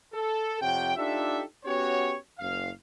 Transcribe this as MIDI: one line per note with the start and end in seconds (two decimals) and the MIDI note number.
0.13 0.59 69
0.62 0.94 41
0.62 0.94 48
0.62 0.94 73
0.62 0.94 78
0.62 0.94 79
0.96 1.42 62
0.96 1.42 63
0.96 1.42 65
0.96 1.42 67
0.96 1.42 69
0.96 1.42 76
1.65 2.15 59
1.65 2.15 61
1.65 2.15 66
1.65 2.15 67
1.65 2.15 73
2.39 2.70 30
2.39 2.70 77